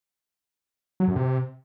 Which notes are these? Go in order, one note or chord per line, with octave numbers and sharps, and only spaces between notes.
F#3
F#2
C3